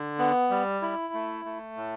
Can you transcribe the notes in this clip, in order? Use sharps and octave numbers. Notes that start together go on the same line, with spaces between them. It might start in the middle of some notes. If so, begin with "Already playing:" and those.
Already playing: D3
B3
G3
E4
A3
A3
A2